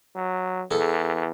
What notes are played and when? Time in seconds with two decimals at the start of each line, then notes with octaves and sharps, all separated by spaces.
0.15 F#3
0.71 E2 G#4 A4